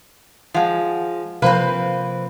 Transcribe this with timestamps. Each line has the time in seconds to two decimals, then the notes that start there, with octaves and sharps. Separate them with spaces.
0.54 F3 G#3 F5 F#5 G#5
1.42 C3 F3 A#3 C4 B4 C5 F5 A#5